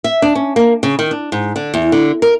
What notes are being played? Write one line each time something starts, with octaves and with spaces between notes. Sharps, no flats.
E5
D4
C#4
A#3
C#3
D#3
D4
G#2
D3
E2
D3
A#4